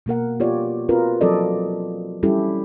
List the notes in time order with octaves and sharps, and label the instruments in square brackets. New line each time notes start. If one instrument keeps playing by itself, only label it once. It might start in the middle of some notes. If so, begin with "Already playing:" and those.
[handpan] B2 A#3 A#4 F#5
B3 F4 G4 C#5 D5
C4 F4 F#4 A#4 B4
F3 F#3 C4 A4 D5 D#5
G3 C#4 E4 G4 A4